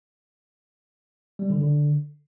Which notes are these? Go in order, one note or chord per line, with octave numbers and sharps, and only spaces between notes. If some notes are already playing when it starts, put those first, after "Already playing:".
G3
D3
D3